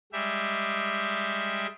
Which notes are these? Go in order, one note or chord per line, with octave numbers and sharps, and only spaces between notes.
G3 G#3 G4 E5